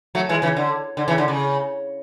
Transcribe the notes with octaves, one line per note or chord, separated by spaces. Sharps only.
F#3 A3
E3 G#3
C#3 E3
D3
D3
C#3 E3
D3
C#3